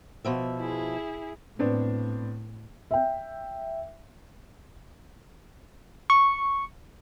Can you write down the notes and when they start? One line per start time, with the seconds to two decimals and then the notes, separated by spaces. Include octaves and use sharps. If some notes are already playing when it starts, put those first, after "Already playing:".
0.25 B2 F3 E5
0.57 E4 G#4
1.59 A2 B3 C4 D4
2.91 E5 G5
6.10 C#6